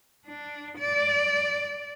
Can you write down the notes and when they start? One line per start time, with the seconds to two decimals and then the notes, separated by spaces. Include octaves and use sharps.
0.26 D4
0.78 D5